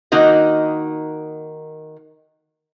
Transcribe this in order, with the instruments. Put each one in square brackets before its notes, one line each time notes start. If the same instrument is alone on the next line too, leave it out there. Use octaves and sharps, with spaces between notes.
[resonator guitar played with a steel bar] D#3 A#3 D#4 F#4 D#5